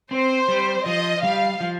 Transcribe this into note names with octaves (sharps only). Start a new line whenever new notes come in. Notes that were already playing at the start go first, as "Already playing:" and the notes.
C4 C5
G3
F3 D#5
G3 F5
F3